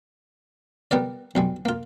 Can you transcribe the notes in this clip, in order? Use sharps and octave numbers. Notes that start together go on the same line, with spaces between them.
G3 B3 A#4 D5
B1 G3 G#3
A#3 F4